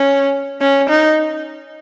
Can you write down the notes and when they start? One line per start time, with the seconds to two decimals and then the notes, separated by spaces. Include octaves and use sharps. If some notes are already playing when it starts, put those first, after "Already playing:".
Already playing: C#4
0.61 C#4
0.89 D#4